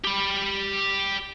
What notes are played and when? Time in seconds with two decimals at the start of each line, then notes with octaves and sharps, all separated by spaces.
0.04 G4 B5